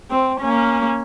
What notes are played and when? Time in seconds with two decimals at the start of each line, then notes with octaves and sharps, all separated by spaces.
0.11 C4
0.40 A#3 C#4